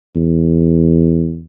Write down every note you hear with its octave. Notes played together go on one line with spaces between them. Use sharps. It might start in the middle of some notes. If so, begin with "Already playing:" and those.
E2